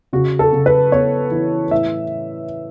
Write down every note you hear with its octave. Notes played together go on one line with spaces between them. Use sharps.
C#3 F#4
A4
C#3
B4
B3 C#5
E3
A2 E5